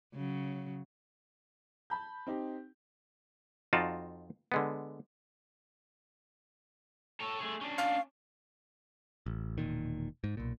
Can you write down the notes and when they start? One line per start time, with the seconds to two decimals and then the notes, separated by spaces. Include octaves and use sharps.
0.14 C#3 F#3
1.90 A5 B5 G6
2.27 C4 D#4 G4
3.73 F2 D#4 F4 F#4 D5 A5
4.52 D3 G#3 B3
7.20 A4 C#5
7.40 A3 G#4
7.61 C#4 D4
7.78 F5
9.26 A1
9.58 E1 A#1 A#2 D#3
10.24 G#2
10.37 B1 A#2